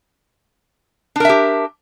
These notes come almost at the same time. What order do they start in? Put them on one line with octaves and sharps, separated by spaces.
D4 A#4 E5 G4